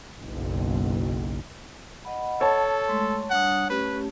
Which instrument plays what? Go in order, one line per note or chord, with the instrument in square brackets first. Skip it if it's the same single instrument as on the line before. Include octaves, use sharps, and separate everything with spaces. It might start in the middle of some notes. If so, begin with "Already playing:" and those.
[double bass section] F#1 B1
[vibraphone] D#5 F#5 B5
[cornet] A4 [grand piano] C#5 A5
[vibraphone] G#3 A3 C6
[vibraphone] G3 D4 D#6 [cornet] F#5
[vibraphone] A3 C#4 G4 [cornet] B4